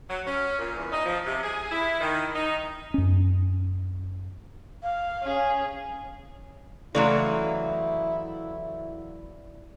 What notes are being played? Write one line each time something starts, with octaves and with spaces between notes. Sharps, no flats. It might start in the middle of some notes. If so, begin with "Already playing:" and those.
F#3
C#4
A#2
E2
D#4
F3
C3
G#4
E4
D#3
D#4
F#2 C#4
F5
C#4 G#4
C#3 E3 F#3 A3 E4 D5 F5 C6